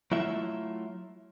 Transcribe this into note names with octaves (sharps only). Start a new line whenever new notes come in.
F#3 A3 E4 F4 E5